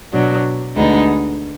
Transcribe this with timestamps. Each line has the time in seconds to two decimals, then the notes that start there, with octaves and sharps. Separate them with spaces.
0.13 B2 F#3 D4
0.76 D2 D3 G#3 B3 D#4